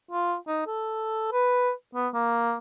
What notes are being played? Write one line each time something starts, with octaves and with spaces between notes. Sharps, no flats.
F4
D#4
A4
B4
B3
A#3